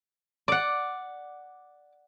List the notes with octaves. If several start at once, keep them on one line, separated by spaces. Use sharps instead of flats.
D5 F#5 D6